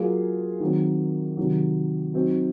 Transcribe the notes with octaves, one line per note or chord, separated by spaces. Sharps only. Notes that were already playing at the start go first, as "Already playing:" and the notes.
Already playing: F#3 A#3 F4 G#4
D#3 F#3 C4
C3 D#3 F#3
F#3 C4 D#4 F#4